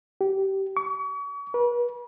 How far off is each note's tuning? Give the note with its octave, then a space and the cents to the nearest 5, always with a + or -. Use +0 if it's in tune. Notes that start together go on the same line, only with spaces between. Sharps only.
G4 -20
C#6 +40
B4 -40